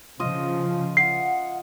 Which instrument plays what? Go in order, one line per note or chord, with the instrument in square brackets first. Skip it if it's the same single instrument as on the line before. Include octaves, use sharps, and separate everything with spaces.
[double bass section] C#3 F3 [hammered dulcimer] F4 D#5
[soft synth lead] F#5 [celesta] C7